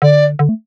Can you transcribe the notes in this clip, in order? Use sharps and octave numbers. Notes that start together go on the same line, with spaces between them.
D3 D5
D3
A3